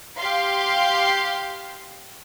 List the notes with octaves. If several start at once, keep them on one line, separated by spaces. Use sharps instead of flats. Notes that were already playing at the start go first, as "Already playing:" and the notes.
G4 F5 C6